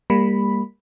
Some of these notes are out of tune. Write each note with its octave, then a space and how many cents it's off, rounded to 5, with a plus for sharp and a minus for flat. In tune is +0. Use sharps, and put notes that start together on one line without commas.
G3 +30 A#3 +0 B5 +0